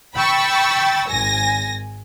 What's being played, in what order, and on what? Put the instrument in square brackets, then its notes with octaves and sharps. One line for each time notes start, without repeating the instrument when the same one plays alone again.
[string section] G5 B5 C#6 E6 A6
G#1 G#5 A#6